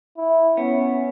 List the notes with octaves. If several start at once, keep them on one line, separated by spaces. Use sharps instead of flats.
E4
B3 C#4